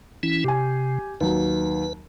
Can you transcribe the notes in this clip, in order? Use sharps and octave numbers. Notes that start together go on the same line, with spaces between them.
E3 C#4 E4
C3 G4 G#5
D#2 F#3 B4